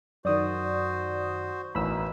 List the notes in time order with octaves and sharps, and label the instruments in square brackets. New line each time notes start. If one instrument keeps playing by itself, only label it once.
[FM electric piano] F#2 D#3 [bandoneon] F#4 C5 [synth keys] D5 D#6
[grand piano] A1 [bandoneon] B2 D#3 [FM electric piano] B5 E6